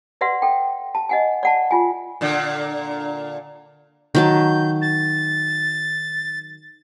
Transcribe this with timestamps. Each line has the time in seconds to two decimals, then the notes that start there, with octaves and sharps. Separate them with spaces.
0.21 B4 D5 E5 F#5 C6
0.42 A4 G5
0.95 A5
1.09 D#5 F#5 G#5
1.43 D5 F#5 A5
1.71 F4 G#5
2.21 A#2 D3
4.15 D#3 F#3 A5 G6
4.82 A6